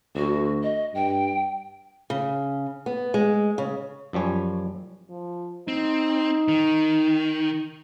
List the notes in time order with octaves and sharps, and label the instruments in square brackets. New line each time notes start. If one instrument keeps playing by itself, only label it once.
[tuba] D2 [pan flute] F#4
[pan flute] D#5
[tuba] G2 [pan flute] G5
[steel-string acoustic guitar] C#3
B3
G#3
C#3
[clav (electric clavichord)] F#2 F3 G3 C#5 G#5
[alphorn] F3
[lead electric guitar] C4 [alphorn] D#4
[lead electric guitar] D#3